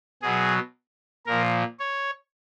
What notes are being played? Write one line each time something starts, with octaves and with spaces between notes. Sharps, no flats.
B2 F#3 G#4
A#2 F3 A#4
C#5